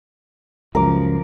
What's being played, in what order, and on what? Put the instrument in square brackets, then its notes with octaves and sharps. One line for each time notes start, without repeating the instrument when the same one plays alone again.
[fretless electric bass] C#2 F#2 [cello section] F3 [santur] A#4 D6